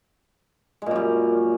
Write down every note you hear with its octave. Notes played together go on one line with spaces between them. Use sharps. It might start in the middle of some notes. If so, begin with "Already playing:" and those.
F#2 A#2 G3 G#3